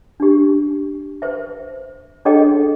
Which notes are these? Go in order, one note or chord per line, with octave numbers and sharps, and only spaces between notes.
D4 G4
B4 C5 E5
D4 G#4 A4 C#5 D#5 G5